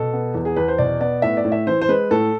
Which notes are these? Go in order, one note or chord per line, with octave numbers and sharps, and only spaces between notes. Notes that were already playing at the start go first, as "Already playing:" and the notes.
Already playing: B2 A4
B3
E2
G#4
E2 B4
C5
B2 D5
B3 D5
A2 E5
D5
A2
E5
E3 C5
C5
G#3 B4
A2 A4